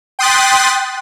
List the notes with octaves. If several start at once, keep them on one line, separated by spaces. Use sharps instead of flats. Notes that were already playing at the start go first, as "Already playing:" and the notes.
G5 C6 D#6 F#6 A6 B6